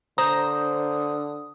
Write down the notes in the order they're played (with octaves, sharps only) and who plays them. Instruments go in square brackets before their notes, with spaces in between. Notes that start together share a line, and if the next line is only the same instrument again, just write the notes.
[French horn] D3 [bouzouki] C5 [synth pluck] A#5 [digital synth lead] D#6